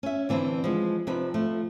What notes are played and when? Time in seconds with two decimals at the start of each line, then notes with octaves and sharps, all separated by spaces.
0.03 C#4 E5
0.29 D3 E3 C4 D4 E4
0.64 F3 G#3
1.07 C3 F3 C4 D4 D#4 B4
1.34 F3 A3